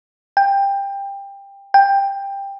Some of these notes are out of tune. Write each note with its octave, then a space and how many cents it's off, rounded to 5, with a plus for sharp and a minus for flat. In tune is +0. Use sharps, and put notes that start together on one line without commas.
G5 +20
G5 +15